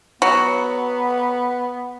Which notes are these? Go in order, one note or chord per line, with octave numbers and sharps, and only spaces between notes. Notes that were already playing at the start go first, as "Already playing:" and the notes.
F#3 B3